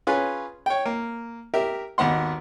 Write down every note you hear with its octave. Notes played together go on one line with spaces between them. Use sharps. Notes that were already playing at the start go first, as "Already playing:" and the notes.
C#4 F4 G#4 B4 G#5
C#5 G5
A#3
G4 A#4 E5
G#1 D#2 B3 F#5 C6